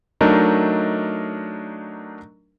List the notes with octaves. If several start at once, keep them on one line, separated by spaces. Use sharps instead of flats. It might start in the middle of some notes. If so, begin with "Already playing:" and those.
F#3 A3 D4 D#4 A#4 D#5